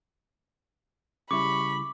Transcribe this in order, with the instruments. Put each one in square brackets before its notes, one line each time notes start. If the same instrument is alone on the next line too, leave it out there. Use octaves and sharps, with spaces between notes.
[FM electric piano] C#3 G3 E4 [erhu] B5 [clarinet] C#6 [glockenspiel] D6